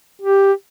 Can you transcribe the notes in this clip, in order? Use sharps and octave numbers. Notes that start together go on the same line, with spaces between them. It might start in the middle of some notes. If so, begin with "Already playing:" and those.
G4